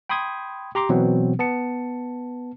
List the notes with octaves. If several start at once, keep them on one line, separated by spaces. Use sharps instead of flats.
G5 B5 C6 D#6 G#6
G4 A#5 C6 D6
B2 E3 F#3 B3 C4
B3 A5 C#7